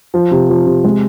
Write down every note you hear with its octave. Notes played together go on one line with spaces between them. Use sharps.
F3
C3
F3
C3
G#3